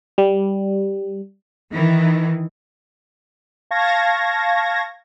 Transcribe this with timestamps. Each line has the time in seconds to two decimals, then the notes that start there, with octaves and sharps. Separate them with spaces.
0.18 G3
1.72 D#3 E3
3.71 F5 A5 C#6 G#6 A#6